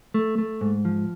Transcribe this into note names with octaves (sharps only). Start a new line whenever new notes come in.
A3
A3
G#2
F3